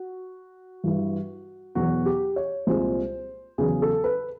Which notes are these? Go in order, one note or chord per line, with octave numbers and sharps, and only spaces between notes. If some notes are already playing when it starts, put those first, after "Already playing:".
Already playing: F#4
G2 E3 G3
E2 B2 F#3 F#4
G4
C#5
C2 A#2 F3 G#3 C5
E2 C#3 F#3 G#4
A4
B4